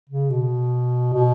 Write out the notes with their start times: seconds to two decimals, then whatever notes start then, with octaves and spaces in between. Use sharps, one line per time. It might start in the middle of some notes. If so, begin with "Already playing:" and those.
0.10 C#3
0.30 B2
1.13 B2